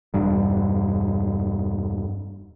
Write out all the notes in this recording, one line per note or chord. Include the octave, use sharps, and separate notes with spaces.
E1 G2